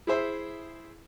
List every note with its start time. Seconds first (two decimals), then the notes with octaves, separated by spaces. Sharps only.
0.07 E4 G#4 C5 E5